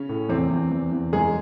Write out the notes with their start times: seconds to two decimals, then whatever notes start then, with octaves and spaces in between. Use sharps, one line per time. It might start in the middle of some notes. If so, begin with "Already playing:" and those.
Already playing: C#3 C#4
0.09 A2
0.29 E2 C3 C4
0.50 E2
0.72 E2
0.92 E2
1.13 F#2 G#3 G#4